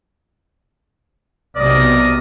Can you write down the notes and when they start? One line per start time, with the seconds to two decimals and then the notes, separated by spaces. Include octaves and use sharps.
1.56 B1 C3 A#4 D5 D#5